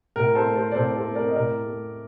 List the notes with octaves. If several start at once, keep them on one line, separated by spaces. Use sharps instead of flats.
A2 A#4
A4 C5
A3
A4 C5
D5
A2 A4 C5
A4 C5
A3
A#4 D5
D#5
A2 A#4 D5
A3